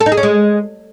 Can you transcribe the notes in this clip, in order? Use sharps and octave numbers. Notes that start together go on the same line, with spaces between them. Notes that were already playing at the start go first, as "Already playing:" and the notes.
A4
D#4
G#4
C#4
G#3